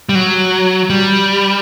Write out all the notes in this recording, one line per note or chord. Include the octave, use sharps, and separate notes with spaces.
G3
F#3
G3